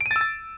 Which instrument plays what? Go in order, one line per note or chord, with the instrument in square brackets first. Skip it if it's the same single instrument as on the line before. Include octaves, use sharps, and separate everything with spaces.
[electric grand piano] D7
D#7
A6
E6
A6